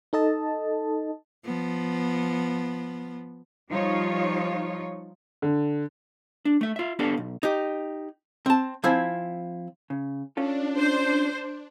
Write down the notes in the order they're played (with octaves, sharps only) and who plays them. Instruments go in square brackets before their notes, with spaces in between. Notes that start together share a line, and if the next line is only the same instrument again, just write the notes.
[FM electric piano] D#4 A4 D#5 A5
[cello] F3 B3
[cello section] F3 G3 D#4 F4 C#5
[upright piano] D3
[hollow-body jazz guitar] D4
A3 E5
F4 E5
B3 D4 G4 A4 D5 F5
B1
D#4 G4
C4 A5
F3 C4 E4 C5 G#5
C#3
[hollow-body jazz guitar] C#4 F4 A4 [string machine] D4
[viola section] C5